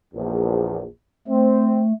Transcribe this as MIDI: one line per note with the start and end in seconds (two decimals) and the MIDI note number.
0.14 0.84 34
0.14 0.84 40
1.28 1.93 57
1.28 1.82 60